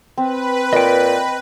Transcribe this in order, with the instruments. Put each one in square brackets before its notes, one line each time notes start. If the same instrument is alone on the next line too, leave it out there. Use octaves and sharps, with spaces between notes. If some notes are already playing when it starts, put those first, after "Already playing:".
[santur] C4 [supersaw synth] B4
[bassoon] A#2 [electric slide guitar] D#5 G5